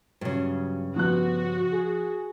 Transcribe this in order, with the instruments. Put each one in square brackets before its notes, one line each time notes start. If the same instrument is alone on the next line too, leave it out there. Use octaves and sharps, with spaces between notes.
[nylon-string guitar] G2 C#3 [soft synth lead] F#3
[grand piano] F3 F#6 [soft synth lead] B3 [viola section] F#4
[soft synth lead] G#4